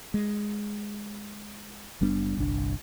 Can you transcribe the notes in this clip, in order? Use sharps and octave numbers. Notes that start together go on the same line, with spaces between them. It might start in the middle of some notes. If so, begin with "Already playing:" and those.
G#3
F#1 G3 B3 D4
G1 C2 D4